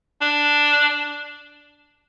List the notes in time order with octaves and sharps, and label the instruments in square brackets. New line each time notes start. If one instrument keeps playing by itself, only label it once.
[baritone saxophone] D4